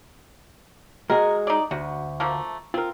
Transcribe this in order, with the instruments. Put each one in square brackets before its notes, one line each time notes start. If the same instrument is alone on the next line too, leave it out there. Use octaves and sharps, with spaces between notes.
[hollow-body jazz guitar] G#3 F#4 G#4 [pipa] A#4
[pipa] D#4 D5
[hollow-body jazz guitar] D2 [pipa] F#4
[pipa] F3 A3 A#3
[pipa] C4 [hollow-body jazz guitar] F4 A#4